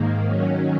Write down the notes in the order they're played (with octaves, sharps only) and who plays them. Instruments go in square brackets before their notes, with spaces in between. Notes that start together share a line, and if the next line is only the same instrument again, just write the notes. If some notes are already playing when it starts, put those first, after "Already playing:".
Already playing: [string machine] G#2 D#3 A#3
D#3 F#3 C#4